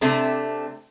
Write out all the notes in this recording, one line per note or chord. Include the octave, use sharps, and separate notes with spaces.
C3 A3 C4 D4